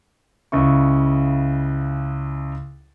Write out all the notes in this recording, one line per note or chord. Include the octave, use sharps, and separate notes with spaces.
C#2 C#3 E4 C#6